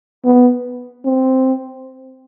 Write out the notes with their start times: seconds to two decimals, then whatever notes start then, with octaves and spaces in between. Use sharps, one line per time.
0.25 B3
1.05 C4